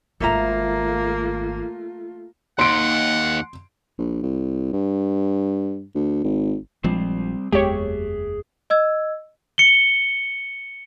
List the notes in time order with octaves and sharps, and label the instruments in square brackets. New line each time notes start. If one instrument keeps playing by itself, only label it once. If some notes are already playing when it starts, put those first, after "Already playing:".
[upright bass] G#1 D#3 [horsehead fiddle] A3 F4 [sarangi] A#3 [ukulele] A4 E5 A#5
[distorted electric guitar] D#2 [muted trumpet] F#5 [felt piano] C6 D7
[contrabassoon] A#1
C2
G2
D2
G#1
[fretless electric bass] A#1 F3 G#3 [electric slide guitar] G3 C4 C5
[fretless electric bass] F#1 E2 G#3 [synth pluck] G4 C#5 [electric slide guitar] G#4 E5
[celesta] D#5 E6 G#6
[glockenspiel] C#7 G7